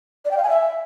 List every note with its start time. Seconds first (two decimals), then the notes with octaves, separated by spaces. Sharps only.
0.25 D5
0.31 G5
0.37 F5
0.43 G#5
0.49 E5